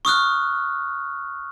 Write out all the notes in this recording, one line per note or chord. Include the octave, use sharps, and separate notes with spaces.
C#6 D#6 F6 F#6